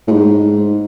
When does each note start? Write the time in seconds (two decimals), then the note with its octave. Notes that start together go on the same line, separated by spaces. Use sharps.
0.07 A2
0.11 G#2